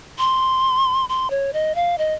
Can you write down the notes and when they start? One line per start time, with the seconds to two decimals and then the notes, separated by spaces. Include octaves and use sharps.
0.19 C6
1.09 C6
1.30 C#5
1.53 D#5
1.75 F5
1.98 D#5